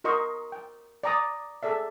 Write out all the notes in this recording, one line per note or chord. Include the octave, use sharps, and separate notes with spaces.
F#4 A#4 D#5 C6 C#6
G5
D5 G5 A#5 D6 D#6
G#4 A4 D5 E5